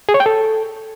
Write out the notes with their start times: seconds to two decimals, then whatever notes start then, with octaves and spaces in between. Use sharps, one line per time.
0.09 G#4
0.14 C#5
0.20 G5
0.26 A4